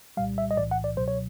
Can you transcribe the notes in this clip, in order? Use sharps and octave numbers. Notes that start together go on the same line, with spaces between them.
C2 A#2 G3 F5
E5
D#5
B1 A2 E3 D5
F#5
D5
C#2 B2 F#3 C5
C#5